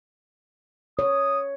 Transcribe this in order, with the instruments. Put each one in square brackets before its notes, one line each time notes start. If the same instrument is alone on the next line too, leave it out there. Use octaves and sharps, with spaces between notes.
[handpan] C#5 [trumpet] D#6